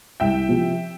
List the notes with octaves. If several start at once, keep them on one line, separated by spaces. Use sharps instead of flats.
C2 E5 G5
C3 F3